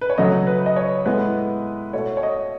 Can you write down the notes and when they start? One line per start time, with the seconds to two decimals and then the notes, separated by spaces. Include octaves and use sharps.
0.01 B4
0.10 C#5
0.18 C#3 F#3 A3 D#5
0.47 B4
0.66 D#5
0.76 C#5
1.05 A2 G#3 B3 B4
1.93 B2 A3 C#5
2.17 C#5
2.23 D#5